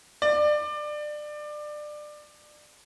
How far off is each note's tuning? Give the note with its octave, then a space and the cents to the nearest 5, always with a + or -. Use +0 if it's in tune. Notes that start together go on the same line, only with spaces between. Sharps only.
D5 +25